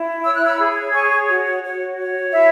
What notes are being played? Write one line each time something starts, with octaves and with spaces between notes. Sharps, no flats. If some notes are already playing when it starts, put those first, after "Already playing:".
Already playing: E4
C#5 E6
F#6
B5 E6
G#4
C#5 G#5 C#6
F#4
F#4 C#5
C#5
E4 E5